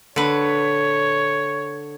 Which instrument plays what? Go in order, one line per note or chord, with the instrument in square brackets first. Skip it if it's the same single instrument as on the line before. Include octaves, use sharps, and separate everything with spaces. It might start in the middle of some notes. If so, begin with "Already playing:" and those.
[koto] D3 B4 [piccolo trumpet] C#5